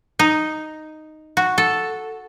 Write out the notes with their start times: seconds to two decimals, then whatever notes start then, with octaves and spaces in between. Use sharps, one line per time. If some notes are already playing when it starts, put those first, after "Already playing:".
0.19 D#4
1.37 F#4
1.58 A4